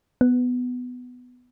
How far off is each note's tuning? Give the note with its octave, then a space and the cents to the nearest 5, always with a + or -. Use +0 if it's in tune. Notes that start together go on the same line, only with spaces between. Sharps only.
B3 +10